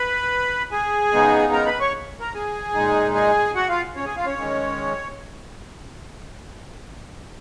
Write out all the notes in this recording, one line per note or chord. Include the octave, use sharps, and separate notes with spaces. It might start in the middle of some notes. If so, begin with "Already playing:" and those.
Already playing: B4 B5
G#4 G#5
C#3 G#3 B3 D#4
A#4 A#5
B4 B5
C#5 C#6
A#4 A#5
G#4 G#5
A#2 G#3 D#4
G#4 G#5
F#4 F#5
F4 F5
C#4 C#5
G#4 G#5
F4 F5
C#4 C#5
D#3 G#3 C#4